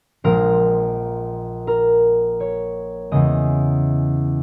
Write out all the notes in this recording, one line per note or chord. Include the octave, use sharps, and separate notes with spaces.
A#1 A#2 G#3 A#4
A#4
C#5
E2 C#3 G#3 D#5